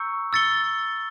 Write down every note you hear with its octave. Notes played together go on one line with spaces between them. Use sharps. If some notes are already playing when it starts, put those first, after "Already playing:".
Already playing: A#5 C#6 E6 G6 C#7
E6 A6 C#7 G7